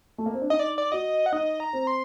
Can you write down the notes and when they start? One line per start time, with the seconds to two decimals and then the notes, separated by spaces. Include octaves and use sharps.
0.18 A3
0.26 A#3
0.34 C4
0.42 D4
0.50 D#4 D#5
0.59 D5
0.78 D5
0.92 F#4 D#5
1.26 F#5
1.32 D#4 D#5
1.60 A#5
1.73 C4
1.87 C6